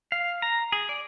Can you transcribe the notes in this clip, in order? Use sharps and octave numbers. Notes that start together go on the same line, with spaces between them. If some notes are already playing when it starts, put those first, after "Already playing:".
F5
A#5
G#4
D5